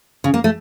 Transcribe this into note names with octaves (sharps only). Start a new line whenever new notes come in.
C#3
A#3
A3